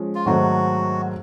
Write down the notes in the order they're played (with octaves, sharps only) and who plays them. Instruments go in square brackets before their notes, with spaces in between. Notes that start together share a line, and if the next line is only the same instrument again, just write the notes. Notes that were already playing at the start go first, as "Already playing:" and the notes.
Already playing: [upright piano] F3 G#3 C#4
[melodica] F4
[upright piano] G#2 D#3 F#3 A3 C4 [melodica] F#4